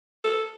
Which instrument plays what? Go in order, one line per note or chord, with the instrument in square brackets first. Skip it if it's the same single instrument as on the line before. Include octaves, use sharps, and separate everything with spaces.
[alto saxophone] A4